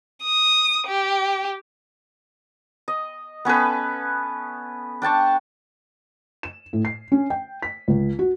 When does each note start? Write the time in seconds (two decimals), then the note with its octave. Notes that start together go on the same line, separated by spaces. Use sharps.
0.23 D#6
0.87 G4
2.88 D#5
3.45 B3 C#4 A4 B4
5.02 D4 G5 A5 C#6
6.43 E7
6.73 A2
6.85 C7
7.12 C#4
7.30 G5
7.62 B6
7.88 C#2
8.19 F#4